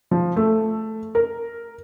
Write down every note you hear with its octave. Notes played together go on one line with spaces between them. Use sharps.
F3
A3
A#4